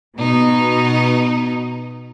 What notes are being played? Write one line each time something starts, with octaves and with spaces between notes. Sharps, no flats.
B2 D#4